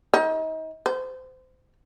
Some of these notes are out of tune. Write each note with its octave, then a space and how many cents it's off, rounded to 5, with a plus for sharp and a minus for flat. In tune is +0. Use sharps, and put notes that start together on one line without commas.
D#4 +35
C5 -25